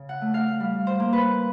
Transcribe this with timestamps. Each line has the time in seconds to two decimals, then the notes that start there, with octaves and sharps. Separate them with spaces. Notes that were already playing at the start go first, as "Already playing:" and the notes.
Already playing: C#3
0.09 F#5
0.21 A3
0.34 F5
0.60 G3
0.87 C5
1.00 A#3
1.13 B4